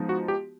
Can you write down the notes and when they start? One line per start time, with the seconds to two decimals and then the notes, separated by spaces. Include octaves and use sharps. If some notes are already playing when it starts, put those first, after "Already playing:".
Already playing: F3 G#3 B3 D#4
0.09 F#4
0.28 G4